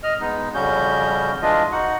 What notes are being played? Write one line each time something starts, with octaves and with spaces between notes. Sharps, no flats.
D#5 F6
G#3 B3 D#4
F2 C#3 G3 C#4 F#4 G6
E3 G#3 D4 F4 D#5
D#4 F#4 F#5